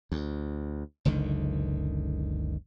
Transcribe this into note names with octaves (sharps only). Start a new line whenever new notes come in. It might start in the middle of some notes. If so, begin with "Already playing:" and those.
D2
F#1 C#2 D3 D#3